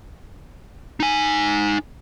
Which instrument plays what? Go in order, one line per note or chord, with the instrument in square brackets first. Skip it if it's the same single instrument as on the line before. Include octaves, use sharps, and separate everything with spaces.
[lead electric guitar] D#4 G#5